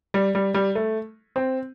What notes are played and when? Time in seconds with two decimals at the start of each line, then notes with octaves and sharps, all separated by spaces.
0.14 G3
0.35 G3
0.54 G3
0.75 A3
1.36 C4